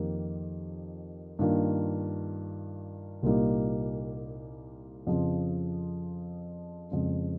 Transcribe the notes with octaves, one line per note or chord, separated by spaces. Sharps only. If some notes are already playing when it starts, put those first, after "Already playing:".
Already playing: F2 D#3 A#3 D#4 G4
G2 D#3 A#3 F4
C2 A#2 G3 A#3 D#4
F2 C#3 F3
F2 C#3 G#3